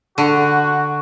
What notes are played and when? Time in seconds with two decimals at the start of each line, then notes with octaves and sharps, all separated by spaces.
0.18 D3 F#4